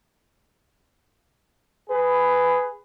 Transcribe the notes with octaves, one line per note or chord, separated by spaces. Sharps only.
G#4 B4